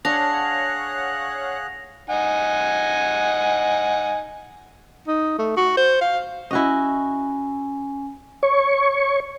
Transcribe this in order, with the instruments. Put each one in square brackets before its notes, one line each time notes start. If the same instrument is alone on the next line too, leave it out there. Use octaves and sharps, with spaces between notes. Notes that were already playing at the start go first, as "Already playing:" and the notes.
[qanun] D4 [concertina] G#4 F#6 [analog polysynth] C#5 F5 F#5 [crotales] A#6 F7
[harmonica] D#4 F#5 G#5
[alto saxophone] D#4
A3
F#4
C5
F5
[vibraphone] C#4 G#5 [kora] E4 F#4 D#5
[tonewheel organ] C#5 C#6